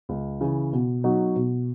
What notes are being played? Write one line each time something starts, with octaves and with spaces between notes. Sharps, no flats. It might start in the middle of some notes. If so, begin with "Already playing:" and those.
C#2
C#3 E3
B2
F#3 B3 D#4 F#4
B2